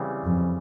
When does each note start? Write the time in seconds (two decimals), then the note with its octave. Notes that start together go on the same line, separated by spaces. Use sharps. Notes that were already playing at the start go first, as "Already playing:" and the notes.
Already playing: C#3 E3 G3 C4
0.26 F2